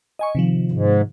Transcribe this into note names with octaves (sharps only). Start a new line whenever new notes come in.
D#5 G#5 C#6
C3 D#3 F3
G#2